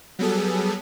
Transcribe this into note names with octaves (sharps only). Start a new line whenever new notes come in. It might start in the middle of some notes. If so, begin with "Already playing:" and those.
F#3 G3 B3 G#4 A4